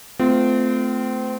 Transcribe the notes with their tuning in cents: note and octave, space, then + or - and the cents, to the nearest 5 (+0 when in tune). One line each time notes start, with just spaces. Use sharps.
A3 -5 C4 -30 F4 +0